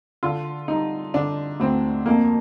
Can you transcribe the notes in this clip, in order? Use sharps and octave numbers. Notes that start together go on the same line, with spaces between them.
D3 F4
G3 D#4
D3 D4
D2 C4
F2 A#3